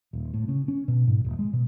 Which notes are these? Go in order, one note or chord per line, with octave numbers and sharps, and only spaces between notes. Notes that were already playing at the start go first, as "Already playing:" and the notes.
D#1
A2
C#3
C#4
B2
G#2
D#1
G#3
B2